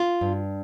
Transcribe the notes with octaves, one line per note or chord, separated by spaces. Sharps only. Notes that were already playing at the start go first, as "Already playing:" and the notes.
Already playing: F4
G2